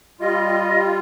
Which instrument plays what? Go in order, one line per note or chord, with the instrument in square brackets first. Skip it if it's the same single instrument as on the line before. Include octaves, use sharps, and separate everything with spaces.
[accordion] G3 F4 [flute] D#5